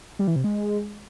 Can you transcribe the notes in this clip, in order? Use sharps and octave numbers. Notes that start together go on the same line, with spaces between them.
G3
E3
C3
G#3